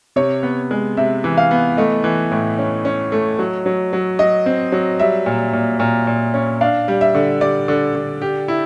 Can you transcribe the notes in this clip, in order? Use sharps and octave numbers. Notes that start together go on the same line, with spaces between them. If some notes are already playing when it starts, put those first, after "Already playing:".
C3 C#5
B3
G#3
C3 E5
E3
F5
B3
A3 D#5
E3
A2
C#4
C#4
A3
F#3
F#3
F#3
F#3 D#5
C4
F#3
G3 E5
A#2
A#2
A#2
A#2
C#4
D4 F5
G3
E5
D3
G3 D5
D3
D3
G4
E4